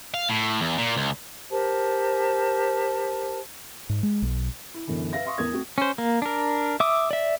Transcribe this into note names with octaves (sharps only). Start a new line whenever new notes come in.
F5
A2
E2
A#2
C#2
G4 A#4 C5 A5
G#2
G#3
B1
E4
F#2 B2 D3 E3
B4 E5 F5 A#6
E5 F5 C6 C#6 D#6
E2 B3 A#4 D#6 G#6
A3 C4 F#4
C#4 C5
A#3
D4 A#4
E5 D6 D#6
D5 E5